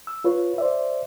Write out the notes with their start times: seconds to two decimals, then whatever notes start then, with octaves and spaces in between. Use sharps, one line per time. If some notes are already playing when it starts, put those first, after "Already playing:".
0.07 E6
0.24 F4 B4 C#5
0.58 C5 D5 E5